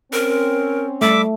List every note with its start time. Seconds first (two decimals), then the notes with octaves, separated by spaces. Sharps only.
0.13 C4 C#4 A#4
1.01 G3 A3 E5 D6